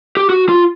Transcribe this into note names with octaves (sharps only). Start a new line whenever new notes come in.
G4
F#4
F4